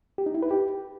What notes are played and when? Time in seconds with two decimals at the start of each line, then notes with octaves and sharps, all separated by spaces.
0.18 G4
0.26 D#4
0.34 E4
0.43 B4
0.51 G4